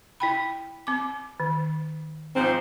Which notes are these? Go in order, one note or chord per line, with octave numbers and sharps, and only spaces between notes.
E4 G5 B5
C4 D6
D#3
G#2 F3 C4